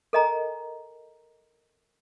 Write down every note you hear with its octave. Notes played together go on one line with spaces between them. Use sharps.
A4 A#4 D#5 G#5 A#5